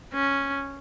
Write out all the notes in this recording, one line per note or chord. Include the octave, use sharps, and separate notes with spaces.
C#4